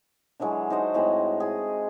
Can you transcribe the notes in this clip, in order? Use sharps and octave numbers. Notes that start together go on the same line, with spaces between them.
D3 E3 F#3 G#3
D#4 F#4 C5 D#5
A2 G#3 C4 B5
G#4